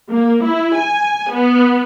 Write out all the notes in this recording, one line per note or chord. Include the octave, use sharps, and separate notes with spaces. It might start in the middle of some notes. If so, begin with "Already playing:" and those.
A#3
E4
G#5
B3